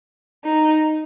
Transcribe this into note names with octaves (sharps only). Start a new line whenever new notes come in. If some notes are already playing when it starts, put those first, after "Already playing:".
D#4